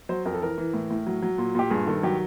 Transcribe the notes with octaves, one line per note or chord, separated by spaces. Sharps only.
F#3 C5
F2 A#4
A4
E3 A#4
E3
A2
A2
F#3
F#3
A#2
A#2 G4
G2 G#4
D#3 A4
F#3 G4